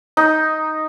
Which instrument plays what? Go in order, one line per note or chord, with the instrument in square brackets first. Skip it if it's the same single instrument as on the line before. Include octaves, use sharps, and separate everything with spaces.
[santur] D#4